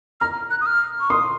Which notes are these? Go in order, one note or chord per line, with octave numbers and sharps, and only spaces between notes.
A#5 F6
F#6
D#6
F6
C#6
C6 D#6